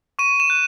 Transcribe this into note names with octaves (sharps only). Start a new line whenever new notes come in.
C#6 D#7
E7
F#6